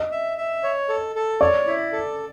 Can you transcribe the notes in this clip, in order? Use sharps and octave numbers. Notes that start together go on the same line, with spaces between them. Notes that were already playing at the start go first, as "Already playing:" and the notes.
Already playing: D#5
E5
E5
C#5
A4
A4
C#5 D5
E4
A4